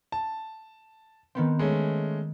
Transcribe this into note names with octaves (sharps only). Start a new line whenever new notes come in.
A5
D#3 B3 C4
G#3 A3 C#4 C#7